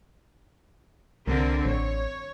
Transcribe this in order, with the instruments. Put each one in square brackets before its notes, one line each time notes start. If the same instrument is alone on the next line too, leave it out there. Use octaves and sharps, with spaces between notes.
[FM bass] C2 [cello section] D3 C4 A#4
[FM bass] A1 [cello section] C#5